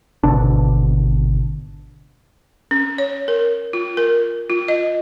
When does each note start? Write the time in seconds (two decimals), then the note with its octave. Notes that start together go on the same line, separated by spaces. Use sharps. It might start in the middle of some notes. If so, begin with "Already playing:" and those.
0.23 G#1 B2 D3 D4
2.71 C#4
2.98 C#5
3.28 A#4
3.73 F4
3.97 A#4
4.50 F4
4.68 D#5